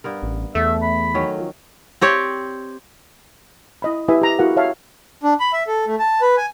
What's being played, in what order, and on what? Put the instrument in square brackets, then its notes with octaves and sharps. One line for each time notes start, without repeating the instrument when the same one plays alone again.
[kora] G2 B3 A#4
[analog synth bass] A1
[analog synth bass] E2 [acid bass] A3 [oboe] E5
[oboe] B5
[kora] D#3 F#3 C#4
[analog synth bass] F3
[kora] C4 G4 C#5 D5
[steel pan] E4 D#5 B5
E4 G4 B4 E5 G#5 D#6
G4 A#5
E4 F#4 G#4 A#4 F5 F#5
C#5 E5 F5 A5
[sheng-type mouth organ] D4
B5
E5
A4
A3
A5
B4
G#5